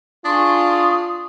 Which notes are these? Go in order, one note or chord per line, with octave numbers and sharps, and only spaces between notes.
D4 F4 G#4 C6 C#6 D#6